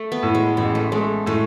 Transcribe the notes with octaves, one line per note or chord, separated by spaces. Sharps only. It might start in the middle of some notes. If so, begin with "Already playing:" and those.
Already playing: A3
B3
A2
G#3
A1 G#3
A3
G#3 A3
A2 A3